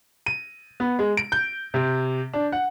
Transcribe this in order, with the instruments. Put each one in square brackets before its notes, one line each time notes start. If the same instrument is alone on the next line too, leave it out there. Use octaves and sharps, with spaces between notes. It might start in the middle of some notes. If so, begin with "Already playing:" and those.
[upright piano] D#7
B3
G#3
D7
G6
C3
D4
F#5